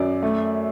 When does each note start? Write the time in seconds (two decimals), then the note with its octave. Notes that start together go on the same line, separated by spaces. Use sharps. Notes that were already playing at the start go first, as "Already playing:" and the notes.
Already playing: F#2 D5
0.22 A3